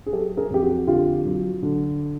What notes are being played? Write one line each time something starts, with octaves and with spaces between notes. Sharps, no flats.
G#4
F#3 G4 A4
G#4 A#4
F2 G4
F#4 G#4
D3 F4 G4
F#3
D3